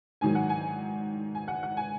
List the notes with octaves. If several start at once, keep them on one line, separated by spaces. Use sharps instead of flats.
G#2 D#3 F#3 G#5
F#5
G#5
G#5
F#5
F#5
G#5